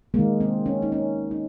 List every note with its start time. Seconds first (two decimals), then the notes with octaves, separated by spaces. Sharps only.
0.14 D#3 G#3 A#3
0.41 C4
0.66 C#4
0.82 D#4
0.92 C#4
1.31 D#4